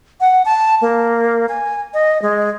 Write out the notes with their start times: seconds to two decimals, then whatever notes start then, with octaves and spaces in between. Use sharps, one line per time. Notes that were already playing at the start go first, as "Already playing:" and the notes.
0.21 F#5
0.45 A5
0.81 A#3
1.49 G#5
1.94 D#5
2.22 G#3